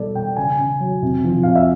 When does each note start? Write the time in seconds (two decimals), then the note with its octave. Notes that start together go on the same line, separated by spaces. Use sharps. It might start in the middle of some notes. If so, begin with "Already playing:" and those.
Already playing: B2 G3 A4 D5
0.15 B2 G5
0.37 C#3 G#5
0.58 C#3
0.80 F#3
1.03 C3
1.24 F3
1.43 C3 F5
1.56 E5